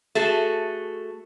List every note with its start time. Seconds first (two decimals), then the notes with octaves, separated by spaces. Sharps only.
0.15 A3 F#4 G#4 A5